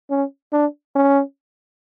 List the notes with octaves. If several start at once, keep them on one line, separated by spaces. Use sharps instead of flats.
C#4
D4
C#4